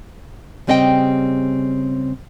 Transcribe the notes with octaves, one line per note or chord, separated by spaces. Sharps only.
C#3 G3 C4 D#5 F5 G5